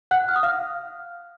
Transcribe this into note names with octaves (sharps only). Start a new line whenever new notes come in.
F#5 F#6
F6
D#6
F5 F6